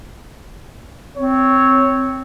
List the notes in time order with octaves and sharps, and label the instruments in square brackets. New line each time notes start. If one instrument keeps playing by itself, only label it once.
[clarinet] C4 [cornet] C#5